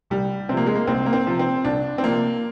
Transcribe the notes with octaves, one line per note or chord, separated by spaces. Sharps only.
C2 G3
C3 F3 C4
A#3
G#3
A#3
C2 C4
A#3
C4
C3 F3
C4
C2 D4
C4
C3 F3 A#3